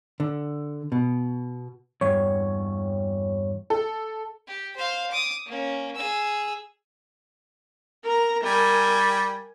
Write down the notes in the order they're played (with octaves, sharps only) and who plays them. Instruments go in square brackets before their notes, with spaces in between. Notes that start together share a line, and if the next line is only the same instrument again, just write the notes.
[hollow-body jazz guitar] D3
B2
[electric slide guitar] E2 G2 [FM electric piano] C#5
[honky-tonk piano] A4
[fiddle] G4
C5 F5
D6 D#6
A#3 C#4
G#4 E6
[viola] A#4 A#5
[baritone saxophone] G3 [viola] A#4 G#5